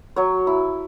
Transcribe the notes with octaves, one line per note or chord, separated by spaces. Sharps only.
F#3 C#5
E4